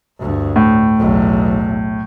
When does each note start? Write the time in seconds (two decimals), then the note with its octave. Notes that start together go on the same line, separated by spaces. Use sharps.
0.18 D2 G2
0.56 A2
0.98 B1 E2